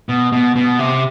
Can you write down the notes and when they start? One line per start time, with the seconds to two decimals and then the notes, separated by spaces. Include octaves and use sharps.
0.09 B2
0.32 B2
0.56 B2
0.79 C3